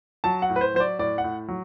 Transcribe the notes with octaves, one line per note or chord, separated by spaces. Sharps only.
F#3 A5
F#5
A2
B4
C5
F#3 C5
D5
A2 D5
F#5
A2
F#3